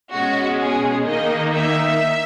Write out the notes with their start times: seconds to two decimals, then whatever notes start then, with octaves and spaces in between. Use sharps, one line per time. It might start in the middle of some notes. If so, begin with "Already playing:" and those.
0.13 B2 G#3 C#4 F#4
0.59 G#4
1.06 D#3 A#3 D#4 D#5
1.53 E5